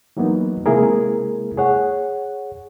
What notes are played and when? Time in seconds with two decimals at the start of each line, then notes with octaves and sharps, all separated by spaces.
0.17 E3 F#3 A#3 B3 D#4
0.66 C3 G#3 A#3 E4 G#4 A#4
1.58 G#4 C#5 F#5